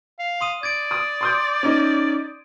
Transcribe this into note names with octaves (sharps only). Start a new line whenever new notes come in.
F5
C6 D#6 D#7
D5 G#6 A6 D7
D#6
C6 D#6 G6
C#4 D#4